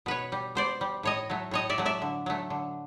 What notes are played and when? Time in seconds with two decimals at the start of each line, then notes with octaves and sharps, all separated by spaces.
0.06 B2 B4 C#5
0.32 G3
0.55 B2 C5 D5
0.81 G3
1.03 A2 C#5 D#5
1.30 F#3 A3
1.51 A2 C#5 D#5
1.70 D5 E5
1.78 F#3 A3
1.85 D5 E5
2.02 D3
2.26 F#3 A3
2.50 D3